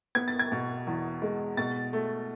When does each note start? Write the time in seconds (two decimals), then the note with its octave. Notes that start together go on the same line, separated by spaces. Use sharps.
0.15 B3 G#6
0.28 A6
0.39 G#6
0.52 B2
0.87 E2
1.22 G#3
1.57 B2 A6
1.93 A3